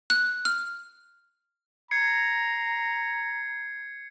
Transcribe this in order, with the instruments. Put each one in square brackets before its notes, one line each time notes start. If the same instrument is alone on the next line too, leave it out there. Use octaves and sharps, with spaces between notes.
[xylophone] F#6
F6
[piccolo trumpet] A#5 [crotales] G#6 C7 C#7